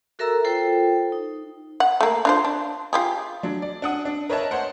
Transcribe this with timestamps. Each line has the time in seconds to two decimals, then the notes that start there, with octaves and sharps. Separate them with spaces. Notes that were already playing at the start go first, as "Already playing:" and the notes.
0.19 F#4 A4 A#4 E5 A#5 E6
0.44 F4 A4 C5 G5
1.12 D#4
1.80 F#5
2.01 A3 A#3
2.25 D4 F4 C5
2.45 D4
2.93 F4 G4 G#4
3.43 F#3 D4
3.62 D5
3.82 D4 F#5 D#6
4.05 D4
4.29 A#4 B4 C#5 D#5 E5 A5
4.51 C5 C#5 F#5